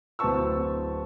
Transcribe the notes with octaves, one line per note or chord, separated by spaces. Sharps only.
D1 B3 C5 A5 C#6 E6